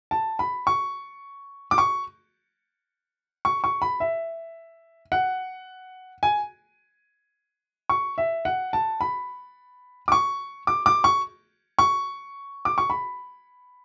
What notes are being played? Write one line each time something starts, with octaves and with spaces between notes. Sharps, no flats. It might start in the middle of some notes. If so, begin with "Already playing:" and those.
A5
B5
C#6
D6
C#6
C#6
C#6
B5
E5
F#5
G#5
C#6
E5
F#5
A5
B5
D6
C#6
D6
D6
C#6
C#6
D6
C#6
B5